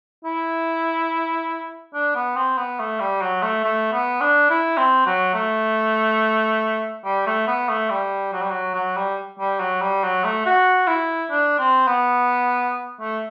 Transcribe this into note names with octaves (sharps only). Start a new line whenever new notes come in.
E4
D4
B3
C4
B3
A3
G3
F#3
A3
A3
B3
D4
E4
C4
F#3
A3
G3
A3
B3
A3
G3
F#3
G3
F#3
F#3
G3
G3
F#3
G3
F#3
A3
F#4
E4
D4
C4
B3
A3